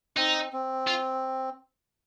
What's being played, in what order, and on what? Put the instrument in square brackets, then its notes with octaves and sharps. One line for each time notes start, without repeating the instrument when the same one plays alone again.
[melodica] C4 [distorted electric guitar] D#4
[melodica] C4
[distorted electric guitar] F4